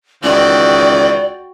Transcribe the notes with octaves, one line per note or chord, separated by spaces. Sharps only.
C#2 D#3 E3 F#4 D5 G5